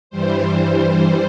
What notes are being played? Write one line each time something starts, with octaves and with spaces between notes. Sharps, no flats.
G2 E3 G3 C5